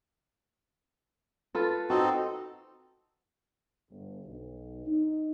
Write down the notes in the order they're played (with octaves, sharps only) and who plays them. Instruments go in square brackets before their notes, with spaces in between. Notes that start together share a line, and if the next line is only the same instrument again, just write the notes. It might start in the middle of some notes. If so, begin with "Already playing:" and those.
[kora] F4 A4 B4
[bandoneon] C4 D#4 A4 [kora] F#4
[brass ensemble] G1
B1
D#4